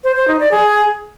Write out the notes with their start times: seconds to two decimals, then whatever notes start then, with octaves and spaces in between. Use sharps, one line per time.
0.04 C5
0.16 C5
0.28 D#4
0.40 D5
0.51 G#4